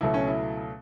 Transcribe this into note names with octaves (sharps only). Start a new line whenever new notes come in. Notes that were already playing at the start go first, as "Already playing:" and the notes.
C#2 B2 F#3 A3 E4
C#4
E4